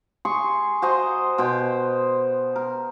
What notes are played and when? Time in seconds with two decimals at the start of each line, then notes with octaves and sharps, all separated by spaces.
0.25 G#4 C6 C#6
0.82 F#4 C5 D#5 A#5
1.38 B2 C5 G5
2.56 A#4